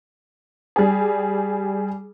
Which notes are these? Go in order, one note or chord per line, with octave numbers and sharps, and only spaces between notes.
G3 G#4